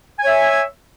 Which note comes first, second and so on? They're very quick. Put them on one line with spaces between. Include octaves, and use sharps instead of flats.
G#5 C#5 E5